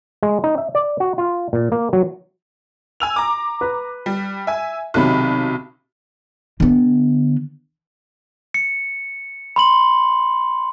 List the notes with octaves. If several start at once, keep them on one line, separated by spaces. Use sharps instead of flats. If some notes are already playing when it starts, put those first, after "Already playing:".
G#3
D#4
E5
D5
F#4
F4
A#2
A#3
F#3
G#5 E6 F7
A#5 D6
B4
G3
E5 G#5
B1 C3 D#3 F#3 B5 F#6
D3 B3
C#7
B5 C6 F#7